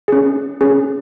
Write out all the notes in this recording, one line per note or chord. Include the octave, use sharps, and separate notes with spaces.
C#4 G#4
C#4 G#4